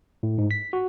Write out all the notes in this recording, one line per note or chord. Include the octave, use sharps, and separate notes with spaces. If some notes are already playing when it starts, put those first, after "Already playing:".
A2
G#2
B6
F#4